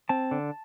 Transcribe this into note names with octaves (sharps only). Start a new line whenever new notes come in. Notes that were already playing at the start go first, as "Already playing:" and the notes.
C4 A5
D3